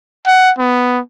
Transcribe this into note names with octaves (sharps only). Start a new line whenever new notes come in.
F#5
B3